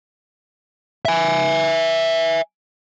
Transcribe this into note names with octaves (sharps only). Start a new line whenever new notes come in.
E5 G#5